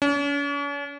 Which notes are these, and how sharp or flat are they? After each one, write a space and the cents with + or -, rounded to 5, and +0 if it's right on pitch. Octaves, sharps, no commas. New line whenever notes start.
C#4 +45